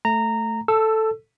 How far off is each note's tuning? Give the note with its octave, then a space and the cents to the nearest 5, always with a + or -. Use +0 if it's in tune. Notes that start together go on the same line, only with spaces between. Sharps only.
A3 +0 A#5 -15
A4 +0 E6 +20